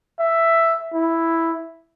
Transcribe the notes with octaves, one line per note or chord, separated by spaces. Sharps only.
E5
E4